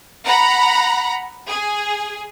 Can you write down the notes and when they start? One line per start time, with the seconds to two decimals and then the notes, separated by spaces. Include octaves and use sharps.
0.25 F#5 A#5 B5
1.47 G#4